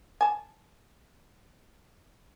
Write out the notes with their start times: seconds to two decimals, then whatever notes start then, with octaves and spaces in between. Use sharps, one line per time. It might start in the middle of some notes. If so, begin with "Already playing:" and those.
0.21 G#5 A5